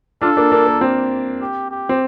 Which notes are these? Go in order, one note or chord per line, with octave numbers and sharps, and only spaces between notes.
D4 F4 A4
A#3 D4
A#3 D4
A#3
C4
G4
G4
C4